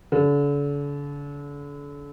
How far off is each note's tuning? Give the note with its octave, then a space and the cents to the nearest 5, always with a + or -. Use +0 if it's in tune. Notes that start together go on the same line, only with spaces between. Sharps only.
D3 -40